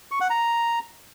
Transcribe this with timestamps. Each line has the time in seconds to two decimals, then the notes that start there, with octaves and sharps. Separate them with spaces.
0.11 C#6
0.21 F#5
0.30 A#5